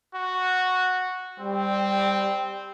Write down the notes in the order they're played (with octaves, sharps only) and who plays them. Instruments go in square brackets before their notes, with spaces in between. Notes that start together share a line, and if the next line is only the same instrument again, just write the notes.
[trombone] F#4
[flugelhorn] G3 [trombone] C4